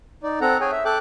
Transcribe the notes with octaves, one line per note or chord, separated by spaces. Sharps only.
D#4 D5
C4 A4 F#5 A#5
G#4 C#5 G5 G#5
E5
A4 G5 D6 F#6